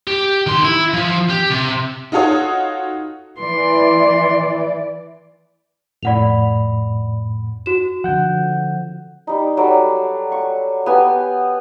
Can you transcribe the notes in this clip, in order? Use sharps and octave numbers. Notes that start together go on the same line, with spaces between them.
G4
D#3 C6
E4
F3
G4
C3
D#4 F4 F#4 A4 C#5 D#6
E3 D5 C6
F2 A2 D5 F#5 B5 F7
F#4 E7
D3 F3 F#5 G6
G3 D#4
F#3 G3 A4 D5
C#6
B3 G4 G#5